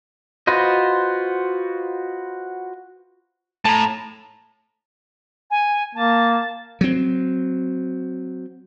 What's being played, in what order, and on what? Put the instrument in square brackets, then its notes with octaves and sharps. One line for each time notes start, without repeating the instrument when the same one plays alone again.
[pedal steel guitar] F4 F#4 B4 C5 D#5
[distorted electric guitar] A2 [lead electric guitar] A5 A#5
[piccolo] G#5
[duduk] A#3 [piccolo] A5
[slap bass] F#3 C4